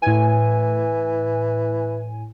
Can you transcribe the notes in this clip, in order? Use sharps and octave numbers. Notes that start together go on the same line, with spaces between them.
A2 E3 G#5